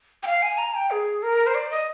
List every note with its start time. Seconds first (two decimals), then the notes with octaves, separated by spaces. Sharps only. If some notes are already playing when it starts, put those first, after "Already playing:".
0.23 G5
0.27 F5
0.42 G#5
0.58 A#5
0.75 G5
0.91 G#4
1.23 A#4
1.47 C5
1.55 D5
1.71 D#5